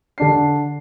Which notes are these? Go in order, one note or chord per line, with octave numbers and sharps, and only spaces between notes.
D3 D4 C7